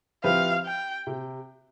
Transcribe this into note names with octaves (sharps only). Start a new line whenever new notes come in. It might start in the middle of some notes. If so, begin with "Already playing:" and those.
F3 C4 E4 G4 B4 F5
G5
C3